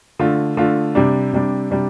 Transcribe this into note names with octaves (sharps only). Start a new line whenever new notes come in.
D3 A3 F4
D3 A3 F4
C3 G3 D4
C3 G3 D4
C3 G3 D4